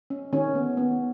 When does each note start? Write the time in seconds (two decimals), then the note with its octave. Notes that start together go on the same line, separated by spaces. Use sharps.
0.10 C#4
0.33 D#3 C#4
0.55 B3
0.77 B3